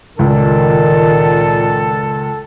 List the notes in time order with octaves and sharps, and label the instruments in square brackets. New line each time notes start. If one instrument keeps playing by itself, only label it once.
[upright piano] C#2 [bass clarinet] A#2 [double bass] D#3 [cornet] A4